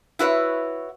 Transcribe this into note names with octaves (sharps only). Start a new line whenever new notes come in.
E4 F#4 B4 C#5